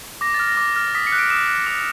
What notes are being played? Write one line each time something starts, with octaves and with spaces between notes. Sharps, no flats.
D6 A#6
A6
F6
A#6
D6
F6
D#6 B6
C#7
F#6
D7
D#6 E7
F#6
D6 F7